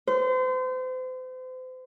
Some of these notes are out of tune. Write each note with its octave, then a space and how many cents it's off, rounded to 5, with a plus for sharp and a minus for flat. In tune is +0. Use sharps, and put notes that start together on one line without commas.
C5 -35